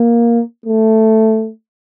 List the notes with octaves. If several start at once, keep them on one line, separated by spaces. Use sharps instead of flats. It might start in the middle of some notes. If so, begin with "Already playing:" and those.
Already playing: A#3
A3